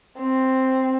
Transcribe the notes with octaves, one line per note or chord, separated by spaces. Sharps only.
C4